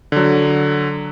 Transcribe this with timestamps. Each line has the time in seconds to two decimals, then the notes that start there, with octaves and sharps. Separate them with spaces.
0.12 D3 F#3